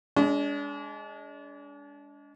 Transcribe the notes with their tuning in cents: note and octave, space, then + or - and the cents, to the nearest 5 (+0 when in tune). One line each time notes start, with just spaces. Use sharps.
G#3 +0 D4 -35